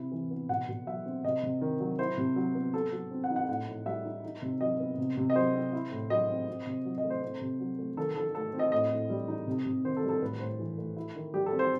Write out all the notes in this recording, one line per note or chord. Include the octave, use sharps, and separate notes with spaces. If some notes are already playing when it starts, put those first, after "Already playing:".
Already playing: C3 E4
E3
B3
B2 F#5
B2
F#3 E5
C4
C3 D#5
C3
D#3
F#3
E4 C5
C3
F#3
B3
F#3 A4
F#3
C4
F#5
D#4
F#5
A2 F#5
A2
G3 E5
D#4
D#4
C3
F#3 D#5
B3
C3
C3
D#5
F#3 C5
C4
E4
A2
F#3 D#5
C4
C4
C3
F#3
D#5
A3
C5
C4 C5
C3
F#3
A3
D#3 A4
D#3 A4
A3 A4
C4
D#5
A2 D#5
A2
G3
D#4
C3
C3
D#3 C5
A4
G3
A4
A2 B4
A2 C5
E3
A3
E4
D#3
G3 G4
A4
C4
C5